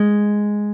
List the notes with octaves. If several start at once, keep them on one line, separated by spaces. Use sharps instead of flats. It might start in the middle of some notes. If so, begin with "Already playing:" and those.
Already playing: G#3